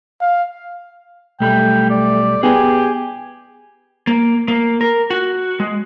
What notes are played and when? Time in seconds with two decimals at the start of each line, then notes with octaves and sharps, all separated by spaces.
0.21 F5
1.40 B1 G3 A3 G5 B5
1.90 D5
2.43 B3 G4 G#4 G#5
4.07 A#3
4.48 A#3
4.81 A#4
5.10 F#4
5.60 G#3